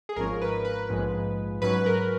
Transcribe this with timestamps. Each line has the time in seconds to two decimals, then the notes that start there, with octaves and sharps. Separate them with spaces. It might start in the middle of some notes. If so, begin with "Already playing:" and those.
0.09 G#4
0.16 G#1 G#2 F3 G#3 C#4 A#4
0.42 B4
0.65 B4
0.90 A#1 G#2 F3 G#3
1.62 G#2 F#3 C#4 B4
1.86 A#4